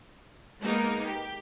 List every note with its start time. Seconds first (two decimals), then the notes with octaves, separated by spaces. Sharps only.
0.62 G#3 A#3 B3 D#4 A#4
1.05 G4